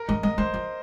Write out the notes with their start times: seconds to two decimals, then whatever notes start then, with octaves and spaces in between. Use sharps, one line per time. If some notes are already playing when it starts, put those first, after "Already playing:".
Already playing: A#4
0.08 G#3 D#5
0.23 G#3 D#5
0.38 G#3 C5
0.54 F3